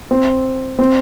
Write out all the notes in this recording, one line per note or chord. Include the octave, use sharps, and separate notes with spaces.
C4
C4